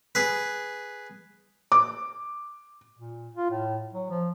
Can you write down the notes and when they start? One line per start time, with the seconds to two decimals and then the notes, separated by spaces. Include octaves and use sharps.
0.15 G#4 B4
1.72 D6
2.97 A#2
3.35 F4
3.50 A2
3.93 F#3
4.10 F3